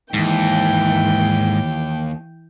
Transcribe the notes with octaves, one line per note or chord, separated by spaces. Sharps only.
D#2 G#2 E3 G5